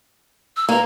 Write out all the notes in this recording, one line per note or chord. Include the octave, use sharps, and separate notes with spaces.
E6
A#3 A#5